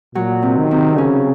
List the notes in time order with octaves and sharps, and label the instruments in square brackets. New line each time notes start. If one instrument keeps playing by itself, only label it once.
[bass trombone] A#2 [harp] F#3
[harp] C3
[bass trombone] D#3
[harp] C3
[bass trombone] C#3 [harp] C#4